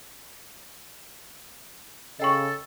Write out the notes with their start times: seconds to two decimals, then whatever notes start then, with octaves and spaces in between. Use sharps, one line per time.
2.20 C#3 A4 D#5 G5 C#6